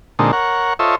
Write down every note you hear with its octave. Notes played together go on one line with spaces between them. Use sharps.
A#2 D3 G#3 C4 D#4 A4
A#4 C#5 F#5
F4 A4 C5 C#5 D#5 E5